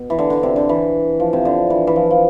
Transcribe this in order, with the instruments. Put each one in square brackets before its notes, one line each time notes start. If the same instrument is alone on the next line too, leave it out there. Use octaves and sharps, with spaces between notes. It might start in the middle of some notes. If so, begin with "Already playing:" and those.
Already playing: [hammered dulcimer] B2
E3
D3
D3
C3
D3
E3
F3
C3
D3
E3
E3
F3
F3